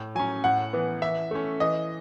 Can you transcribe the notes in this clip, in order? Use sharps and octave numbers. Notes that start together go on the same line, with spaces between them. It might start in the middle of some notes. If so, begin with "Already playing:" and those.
Already playing: A2
F#3 C#4 G#5
A2 F#5
E3 B3
E3 E5
A3 C#4
E3 D#5